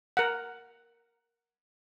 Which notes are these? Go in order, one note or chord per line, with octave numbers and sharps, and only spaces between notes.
A#4 F#5